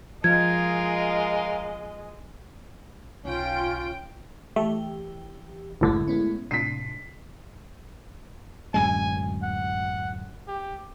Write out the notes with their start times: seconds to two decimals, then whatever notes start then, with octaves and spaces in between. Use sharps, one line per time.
0.24 F3 G#3 F4 A#4 D#5 F5 G#6
3.25 B1 C#4 F4 G5 D7
4.56 E3 A3 G4
5.81 G1 C2 F#2 A2 D3 G#3
6.08 G#3 B3 C#4
6.51 A2 C3 D4 B6 C7
8.74 D1 F#2 G#3 G#5
9.43 F#5
10.48 G4